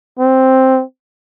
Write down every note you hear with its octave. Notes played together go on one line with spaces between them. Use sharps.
C4